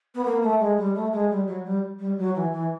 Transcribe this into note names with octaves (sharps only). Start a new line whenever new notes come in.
B3
A#3
A3
G#3
G3
A3
G#3
G3
F#3
G3
G3
F#3
E3
E3